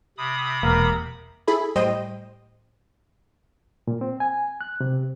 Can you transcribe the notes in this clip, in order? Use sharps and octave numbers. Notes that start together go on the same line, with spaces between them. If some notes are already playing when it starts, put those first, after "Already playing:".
C3 B5 D#6
E1 A#3
E4 G#4 A4 B5
A2 G3 C5 D#5 G5 D#7
A#2
C4
G#5
F#6
C3